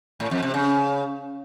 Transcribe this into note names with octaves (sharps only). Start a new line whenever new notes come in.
A2
F2
C3
C#3